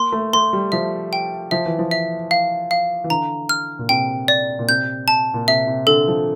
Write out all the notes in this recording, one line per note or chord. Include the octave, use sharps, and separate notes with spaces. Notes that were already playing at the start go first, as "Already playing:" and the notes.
Already playing: A#3 C6
A3
A3 C6
G3
F3 E5
G5
F3 E5
E3
F3
E5
F5
F5
E3
D3 A#5
F6
A#2
C3 G5
D5
A#2
C3 G6
A5
A#2
C3 E5
C3
D3 A4
F3